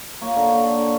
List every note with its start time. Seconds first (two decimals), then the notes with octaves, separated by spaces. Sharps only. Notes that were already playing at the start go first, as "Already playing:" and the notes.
0.21 A#3 C#5
0.36 D3
0.50 D3
0.64 D3
0.78 D3